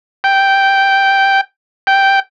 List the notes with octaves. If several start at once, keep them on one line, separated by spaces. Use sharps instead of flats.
G5
G5